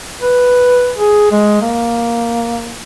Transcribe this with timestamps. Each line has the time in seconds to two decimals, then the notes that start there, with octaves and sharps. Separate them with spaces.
0.21 B4
0.98 G#4
1.31 G#3
1.62 A#3